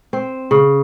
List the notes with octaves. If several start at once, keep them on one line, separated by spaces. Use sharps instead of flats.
C4
C#3